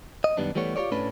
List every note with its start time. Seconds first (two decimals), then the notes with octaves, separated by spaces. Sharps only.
0.24 D#5
0.37 F#2 D#3 G3 B3 D4
0.55 E3 G3 A3 B3 C#5
0.76 F4 G4 A#4 C#5 D5
0.92 A2 A3 C#4 D4 B4